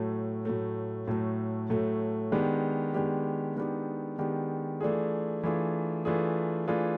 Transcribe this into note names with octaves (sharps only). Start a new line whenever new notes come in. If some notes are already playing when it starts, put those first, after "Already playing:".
Already playing: A2 F#3 A3
A2 F#3 A3
A2 F#3 A3
A2 F#3 A3
D#3 G#3 B3 D4 G4
D#3 G#3 B3 D4 G4
D#3 G#3 B3 D4 G4
D#3 G#3 B3 D4 G4
E3 A3 D4 F4 G#4
E3 A3 D4 F4 G#4
E3 A3 D4 F4 G#4
E3 A3 D4 F4 G#4